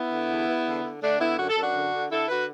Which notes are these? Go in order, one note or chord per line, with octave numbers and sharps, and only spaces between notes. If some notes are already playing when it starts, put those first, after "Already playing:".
Already playing: B3 E4
D3
E2
E2
D3
D3
D3 A3 D4
D3 B3 E4
F#2 F#4
A4
F#2 D4 F#4
D3
D3
D3 E4 A4
D3 F#4 B4